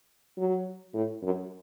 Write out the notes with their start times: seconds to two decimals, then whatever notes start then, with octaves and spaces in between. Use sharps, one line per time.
0.38 F#3
0.94 A2
1.23 F#2